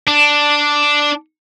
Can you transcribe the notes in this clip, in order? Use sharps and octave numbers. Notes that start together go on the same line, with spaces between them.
D4